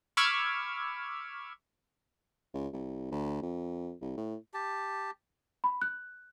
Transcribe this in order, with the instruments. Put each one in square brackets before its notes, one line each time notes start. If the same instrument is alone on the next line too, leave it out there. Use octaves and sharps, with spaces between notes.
[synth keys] B5 C#6 D6 E6 F6 G#6
[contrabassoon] C#2
C2
D2
F2
C2
A2
[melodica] G4 A5
[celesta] B5
F#6